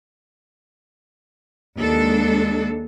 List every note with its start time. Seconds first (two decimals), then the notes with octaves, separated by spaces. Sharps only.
1.79 D#2 G#3 D4 A4